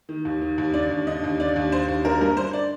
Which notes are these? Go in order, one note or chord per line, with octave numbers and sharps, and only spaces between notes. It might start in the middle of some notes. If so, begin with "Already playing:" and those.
D#3
D#2
D#3
D#2
D3 D5
D#2
D3 D#5
D#2
D3 D5
D#2
D3 C5
D#2
D3 A#4
G2 A#4
D3 C5
D5